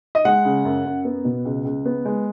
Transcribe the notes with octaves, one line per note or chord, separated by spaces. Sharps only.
D#5
G#3 F#5
C#3
F#2
F#2
B3
B2
C#2
C#2
B3
G#3